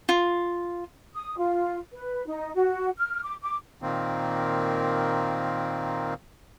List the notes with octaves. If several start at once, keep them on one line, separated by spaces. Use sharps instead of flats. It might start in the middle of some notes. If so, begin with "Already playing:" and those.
F4
D#6
F4
B4
D#4
F#4
F6
D6
D6
A#2 D#3 A#3 C4